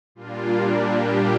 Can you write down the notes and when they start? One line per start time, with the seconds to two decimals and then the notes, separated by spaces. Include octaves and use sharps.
0.15 A#2 G3 A#3 D4 F4
0.92 G4